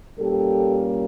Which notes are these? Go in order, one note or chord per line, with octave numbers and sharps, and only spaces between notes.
A#2 G3 A#3 C#4 G4 A4